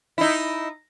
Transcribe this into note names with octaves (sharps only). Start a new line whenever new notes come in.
D#4 E4